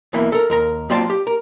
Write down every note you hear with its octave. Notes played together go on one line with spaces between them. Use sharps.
B1 B2 E3 A#3 E5
A4 A#4
D#2 A#4 A#5
F#3 A#3 C4 F4 D5 A5
G4
A#4